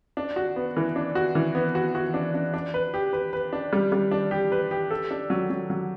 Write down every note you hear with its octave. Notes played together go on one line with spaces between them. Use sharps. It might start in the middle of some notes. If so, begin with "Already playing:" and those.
D4
F#4
B3
E3
D4
F#4
E3
B3
F#4
F#4
D4
D4
D4
B4
G4
B4
B4
D4
G3
G3
D4
G4
B4
G4
A4
D4
F#3
F#3
F#3